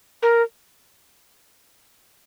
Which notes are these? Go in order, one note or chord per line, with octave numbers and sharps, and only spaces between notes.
A#4